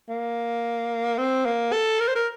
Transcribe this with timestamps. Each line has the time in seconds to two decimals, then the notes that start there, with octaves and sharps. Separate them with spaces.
0.09 A#3
1.18 C4
1.45 A#3
1.72 A4
2.00 A#4
2.08 C5
2.15 A#4